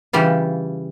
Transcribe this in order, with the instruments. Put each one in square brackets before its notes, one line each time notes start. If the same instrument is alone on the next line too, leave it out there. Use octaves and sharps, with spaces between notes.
[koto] C#3 E3 G3 F4